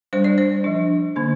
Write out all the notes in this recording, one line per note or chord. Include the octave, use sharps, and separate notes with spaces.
G3 D4 C5
D5
C5
F3 D4
D3 A#3 D4